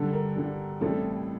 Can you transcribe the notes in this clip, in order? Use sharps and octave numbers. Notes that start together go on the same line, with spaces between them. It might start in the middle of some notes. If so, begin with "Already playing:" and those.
Already playing: G2 D3 G3 A4
A#4
G2 D3 G3
A1 A2 G3 C4 A4